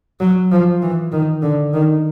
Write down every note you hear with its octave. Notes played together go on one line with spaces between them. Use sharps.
F#3
F3
E3
D#3
D3
D#3